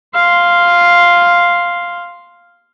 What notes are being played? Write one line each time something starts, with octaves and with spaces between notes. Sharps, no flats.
F5 C6